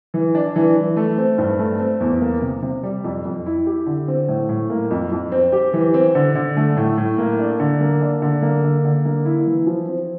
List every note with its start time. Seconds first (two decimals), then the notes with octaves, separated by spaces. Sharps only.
0.14 E3
0.35 D4
0.56 E3
0.76 E3
0.97 A3
1.18 C4
1.38 G2
1.59 A3
1.80 C4
2.00 E2
2.21 A#3
2.42 C3
2.62 C3
2.83 G3
3.04 F2
3.25 F2
3.46 E4
3.66 G4
3.86 D3
4.08 C4
4.28 A2
4.49 A2
4.70 A#3
4.90 F2
5.11 F2
5.32 C4
5.52 G4
5.73 E3
5.94 C4
6.15 D3
6.35 D3
6.57 A3
6.77 A2
6.98 A2
7.18 A#3
7.39 D4
7.60 D3
7.80 A#3
8.01 D4
8.22 D3
8.42 A#3
8.64 D3
8.84 D3
9.05 A#3
9.25 E4
9.47 E3
9.67 F3
9.88 C4